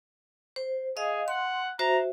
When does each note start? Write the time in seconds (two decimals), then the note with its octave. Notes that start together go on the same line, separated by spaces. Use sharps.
0.56 C5
0.97 G#4 D#5 F5
1.28 F#5 C6
1.79 F#4 C5 E5 A#5